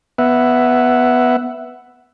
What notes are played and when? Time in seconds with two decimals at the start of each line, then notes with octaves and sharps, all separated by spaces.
0.18 B3 E5 F#5